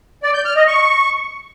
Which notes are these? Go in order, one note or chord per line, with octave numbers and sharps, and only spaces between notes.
D5
G6
F6
D#5
C#6